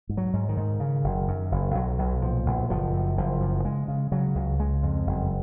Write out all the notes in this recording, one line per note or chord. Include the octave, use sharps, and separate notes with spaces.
G#2
F#3
G#2
D#3
G#2
C#3
F#1
F#2
F#1
B1 F#3
B1
A#2 F3
B1
F#1 F3
F#2
F#1 F3
F#2
C#3 G#3
C#3
C#3 F#3
C#2
C#3 G#3
F2
F#1